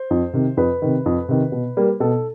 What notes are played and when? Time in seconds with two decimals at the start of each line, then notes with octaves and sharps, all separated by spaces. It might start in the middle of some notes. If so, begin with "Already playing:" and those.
Already playing: C5
0.11 F2
0.33 C3 D#3
0.57 F2 B4
0.82 C3 D#3
1.06 F2
1.29 C3 D#3
1.52 B2
1.77 G3 A#3
2.00 B2 A4